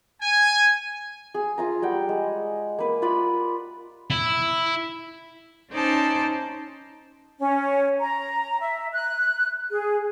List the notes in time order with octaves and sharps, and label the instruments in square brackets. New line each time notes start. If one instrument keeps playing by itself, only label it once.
[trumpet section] G#5
[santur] G#4
F4 F5 A#5
G3 F#5 G5
G#3
A#3 B4
F4 B4 D5 B5
[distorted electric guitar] E4
[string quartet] C#4 D#4 C5 D5 A5
[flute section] C#4
A#5
E5
F#6
G#4